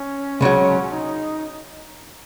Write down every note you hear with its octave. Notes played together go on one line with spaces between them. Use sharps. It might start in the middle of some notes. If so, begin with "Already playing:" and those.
Already playing: C#4
C#2 C#3 F#3
D#4